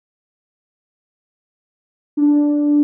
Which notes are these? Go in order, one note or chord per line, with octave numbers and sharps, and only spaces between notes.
D4